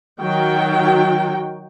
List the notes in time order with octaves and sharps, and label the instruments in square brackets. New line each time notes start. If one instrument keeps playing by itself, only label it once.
[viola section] D#3 F#3 F#4 G5